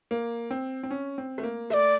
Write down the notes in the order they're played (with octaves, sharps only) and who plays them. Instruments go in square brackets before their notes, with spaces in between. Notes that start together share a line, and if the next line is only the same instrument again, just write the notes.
[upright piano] A#3
C4
C4
C#4
C4
A3
A#3
[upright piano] A3 [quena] E5
[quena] D5